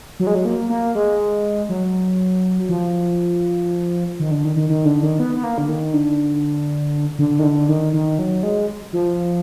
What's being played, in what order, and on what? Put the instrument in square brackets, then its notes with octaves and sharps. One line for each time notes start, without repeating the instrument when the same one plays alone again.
[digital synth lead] F#3
G#3
F#3
A#3
A#3
G#3
F#3
F3
D#3
D3
D#3
D#3
D#3
D3
D#3
B3
B3
A#3
D3
D#3
D3
D3
D#3
D3
D#3
D#3
F#3
G#3
F3